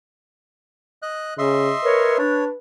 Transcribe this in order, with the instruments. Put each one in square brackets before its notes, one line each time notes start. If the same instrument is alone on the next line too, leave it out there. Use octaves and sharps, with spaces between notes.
[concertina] D#5 F#6
[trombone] C#3 [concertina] D#5 E5 C6
[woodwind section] A#4 C#5 [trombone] B4
[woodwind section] D4 [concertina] C#5